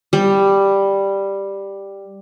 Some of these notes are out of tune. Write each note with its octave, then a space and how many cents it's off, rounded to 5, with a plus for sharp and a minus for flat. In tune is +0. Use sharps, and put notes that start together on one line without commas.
G3 +5